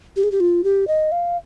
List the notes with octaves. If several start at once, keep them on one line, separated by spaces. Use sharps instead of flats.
G4
G#4
G4
F4
G4
D#5
F5